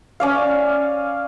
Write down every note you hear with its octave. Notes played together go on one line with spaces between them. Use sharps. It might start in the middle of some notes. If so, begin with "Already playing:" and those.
C#4 D5 F5